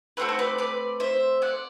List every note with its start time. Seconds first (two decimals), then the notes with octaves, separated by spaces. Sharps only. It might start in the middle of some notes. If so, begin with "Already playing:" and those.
0.17 A3 C4 F#4 A4 B4
0.29 C5
0.39 B4 D5
0.58 B4 D5
1.00 C5 E5
1.42 D5 F#5